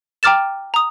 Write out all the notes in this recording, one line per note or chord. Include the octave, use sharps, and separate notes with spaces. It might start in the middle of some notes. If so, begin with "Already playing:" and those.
G5 A#5 D6 F6 A6 E7
A#5 D#6